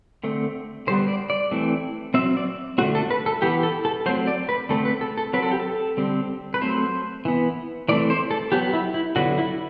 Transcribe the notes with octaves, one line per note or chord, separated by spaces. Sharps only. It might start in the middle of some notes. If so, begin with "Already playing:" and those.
D3 A3 C4
D3 G3 B3 C5
D5
D5
E3 A3 C4
F#3 C4 E5
D5
D3 A3 C4 F#4
A4
B4
A4
E3 B3 G4
A4
A4
F#3 A3 C4 C5
D5
B4
D3 A3 C4 A4
B4
A4
A4
F#3 C4 B4
A4
G4
A4
D3 G3 C4
B4
F#3 A3 C4 C5
E3 B3
E3 A3 C4 D5
C5
A4
F#3 B3 G4
E4
E4
D3 F#3 B3 F#4
E4